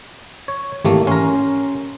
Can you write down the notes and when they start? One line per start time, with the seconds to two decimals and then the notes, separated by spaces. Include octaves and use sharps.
0.48 C#5
0.85 G#1 E3 A3 A#3 G4
1.07 C#4 A#4 C6